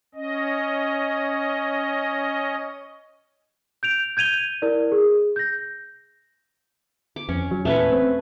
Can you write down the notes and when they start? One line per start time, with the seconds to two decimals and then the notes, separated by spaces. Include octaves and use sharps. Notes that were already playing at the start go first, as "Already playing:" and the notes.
0.15 C#4 D#5
3.83 G6 D7 F7
4.17 G6 G#6 D#7 F7 G7
4.62 E4 A#4 D5
4.92 G#4
5.36 G6 A#6
7.16 D6
7.29 F2 C#4
7.51 F#3
7.65 E2 A#2 A3 C#4 B4
7.92 C4